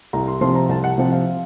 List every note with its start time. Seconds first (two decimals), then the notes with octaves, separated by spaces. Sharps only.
0.13 C2 A#5
0.27 C6
0.41 C3 F3 C6
0.55 A#5
0.69 C2 A5
0.84 F#5
0.98 C3 F3 F#5
1.12 F5